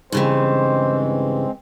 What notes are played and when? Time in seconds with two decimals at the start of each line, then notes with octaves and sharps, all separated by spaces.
0.12 G2 C#3 E3 G#3 C4 C5